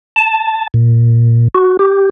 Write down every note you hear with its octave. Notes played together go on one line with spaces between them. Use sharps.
A5
A#2
F#4
G4